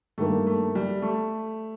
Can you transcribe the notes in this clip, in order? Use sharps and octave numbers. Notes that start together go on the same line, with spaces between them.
G2 D#3 A3 A#3
A3
G3
A3